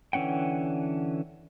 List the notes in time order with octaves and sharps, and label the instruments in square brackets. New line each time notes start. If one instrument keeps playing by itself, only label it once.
[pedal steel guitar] D3 E3 C#4 F#5 G5